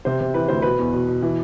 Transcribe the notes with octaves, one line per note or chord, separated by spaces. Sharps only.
C3 C5
C3
E3 B4
D2 C5
B2 B4
E2
B2
B2
E3